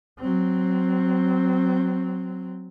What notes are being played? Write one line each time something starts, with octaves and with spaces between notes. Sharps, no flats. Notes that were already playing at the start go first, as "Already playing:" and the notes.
F#3 C4